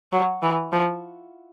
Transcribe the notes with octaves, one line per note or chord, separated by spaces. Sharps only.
F#3
E3
F3